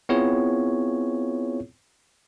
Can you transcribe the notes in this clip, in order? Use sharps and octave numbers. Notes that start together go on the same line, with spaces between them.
B3 C4 E4 F4 G#4 C#5